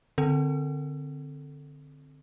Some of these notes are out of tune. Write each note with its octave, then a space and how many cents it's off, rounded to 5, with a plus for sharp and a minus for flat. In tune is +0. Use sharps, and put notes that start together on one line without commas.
D3 +0 C4 +0 A4 +0